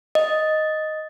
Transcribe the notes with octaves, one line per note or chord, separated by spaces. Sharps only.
D#5